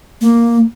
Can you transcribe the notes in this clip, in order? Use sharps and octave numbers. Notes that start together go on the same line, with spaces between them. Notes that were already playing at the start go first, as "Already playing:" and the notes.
A#3